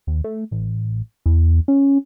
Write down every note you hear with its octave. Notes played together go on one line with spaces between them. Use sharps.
D#2
A3
A1
E2
C#4